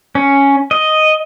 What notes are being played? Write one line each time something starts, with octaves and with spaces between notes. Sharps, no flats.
C#4
D#5